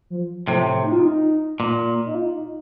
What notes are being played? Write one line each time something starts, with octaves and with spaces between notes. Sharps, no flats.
F3
A2 C3 F3
D#4
F4
D#4
A#2
D#4
F4
D#4